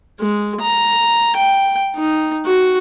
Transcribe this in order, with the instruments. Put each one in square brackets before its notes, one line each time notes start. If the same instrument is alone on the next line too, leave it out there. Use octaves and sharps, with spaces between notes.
[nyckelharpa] G#3
A#5
G5
D#4
F#4